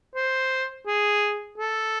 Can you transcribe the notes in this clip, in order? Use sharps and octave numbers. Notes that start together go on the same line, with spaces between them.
C5
G#4
A4